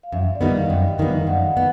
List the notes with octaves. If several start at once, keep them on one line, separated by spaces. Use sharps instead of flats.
F5
F#2 E5
D5
D#3 G3 B3 D#5
F5
F#2 G5
D#3 G3 B3
F#2 F#5
B3